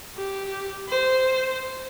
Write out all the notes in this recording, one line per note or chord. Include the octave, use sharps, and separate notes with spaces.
G4
C5